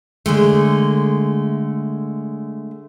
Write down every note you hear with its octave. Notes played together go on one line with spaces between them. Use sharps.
D3 G#3 A3